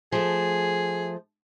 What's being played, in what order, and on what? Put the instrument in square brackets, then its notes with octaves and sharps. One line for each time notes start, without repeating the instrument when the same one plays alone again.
[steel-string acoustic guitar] F3 A3 [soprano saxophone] G#4